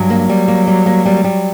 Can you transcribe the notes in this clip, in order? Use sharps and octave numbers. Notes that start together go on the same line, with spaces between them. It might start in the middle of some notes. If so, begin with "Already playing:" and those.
Already playing: G2 F#3
A#3
G3
A#3
G3
A#3
G3
G3